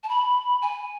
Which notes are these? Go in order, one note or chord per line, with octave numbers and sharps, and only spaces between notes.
A5
B5
G#5